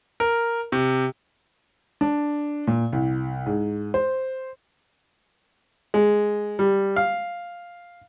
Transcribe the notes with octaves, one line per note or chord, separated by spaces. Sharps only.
A#4
C3
D4
A#2
C2
G#2
C5
G#3
G3
F5